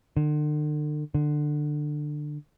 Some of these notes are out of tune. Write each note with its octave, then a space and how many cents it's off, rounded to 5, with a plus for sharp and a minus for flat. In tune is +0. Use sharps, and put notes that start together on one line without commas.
D3 +40
D3 +20